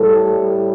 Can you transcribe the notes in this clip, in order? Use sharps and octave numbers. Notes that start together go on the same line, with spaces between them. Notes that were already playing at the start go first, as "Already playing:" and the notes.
Already playing: A2 G3 A4